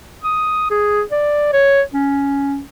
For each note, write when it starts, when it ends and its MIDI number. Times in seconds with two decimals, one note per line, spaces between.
0.23 0.66 87
0.70 1.03 68
1.11 1.49 74
1.53 1.82 73
1.93 2.61 61